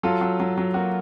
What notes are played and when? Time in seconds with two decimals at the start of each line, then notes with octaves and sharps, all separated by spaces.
0.03 F#3 F4 A4
0.21 F#3
0.40 F#3
0.58 F#3
0.74 A#3 F#4